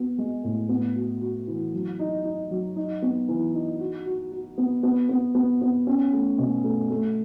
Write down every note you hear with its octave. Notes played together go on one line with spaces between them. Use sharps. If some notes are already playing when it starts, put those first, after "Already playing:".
Already playing: B3 F#4
G#3
A2
B3
F#4
F#4
E3
F#3
D#4
D#4
F#3
D#4
B3
E3
D#4
F#4
F#4
F#4
B3
B3
B3
B3
B3
C#4
A3
B2
A3
A3